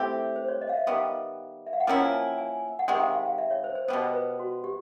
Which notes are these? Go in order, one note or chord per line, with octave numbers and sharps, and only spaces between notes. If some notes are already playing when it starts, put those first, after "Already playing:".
Already playing: A3 C4 E4 G4
C5
C#5
D#5
F5
E5
D#3 G3 B3 E5
E5
F5
F#5
F3 A#3 C#4 E4 G5
G#5
A5
G#5
F#5
C3 D#3 G#3 G5
F5
F5
F5
E5
C#5
C5
C5
B2 G3 B3 C5
B4
F#4
G4